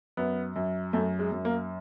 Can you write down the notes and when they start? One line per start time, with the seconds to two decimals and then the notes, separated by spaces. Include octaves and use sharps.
0.17 F#2 B3
0.56 F#2
0.93 F#2 A3
1.19 G#3
1.32 F#2
1.45 A#3